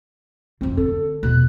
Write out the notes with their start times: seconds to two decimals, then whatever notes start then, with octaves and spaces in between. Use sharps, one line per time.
0.61 F2 D3 C4
0.77 D3 A4
1.23 E2 B2 F#6